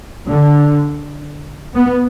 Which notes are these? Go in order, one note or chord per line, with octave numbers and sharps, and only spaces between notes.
D3
B3